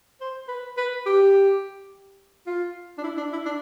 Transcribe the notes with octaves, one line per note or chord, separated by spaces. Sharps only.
C5
B4
B4
G4
F4
D4
E4
D4
E4
D4